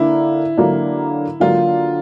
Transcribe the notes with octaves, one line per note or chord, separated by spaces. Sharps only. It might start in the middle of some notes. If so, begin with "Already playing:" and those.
Already playing: D3 A#3 D4 E4
D3 F#3 A#3 D4
D3 F#3 A#3 D4 F4